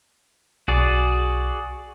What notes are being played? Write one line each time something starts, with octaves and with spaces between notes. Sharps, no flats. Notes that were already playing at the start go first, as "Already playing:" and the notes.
B1 F#4 G#4 D5